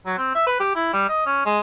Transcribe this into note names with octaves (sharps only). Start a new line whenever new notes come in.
F#3
C4
E5
B4
G4
E4
G3
D#5
C#4
G#3